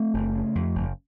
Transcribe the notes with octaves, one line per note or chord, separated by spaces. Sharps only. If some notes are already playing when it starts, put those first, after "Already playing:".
Already playing: A3 C4
F#1
C#3
F2
F#1